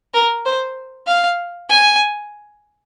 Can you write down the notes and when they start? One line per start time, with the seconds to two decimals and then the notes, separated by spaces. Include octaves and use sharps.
0.14 A#4
0.45 C5
1.07 F5
1.69 G#5